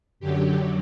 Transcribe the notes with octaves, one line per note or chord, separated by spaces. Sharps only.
F#2 D3 F#3 G4